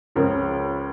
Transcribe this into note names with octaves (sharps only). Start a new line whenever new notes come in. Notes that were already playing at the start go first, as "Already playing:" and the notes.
C#2 C#3 F3 C#4 A#4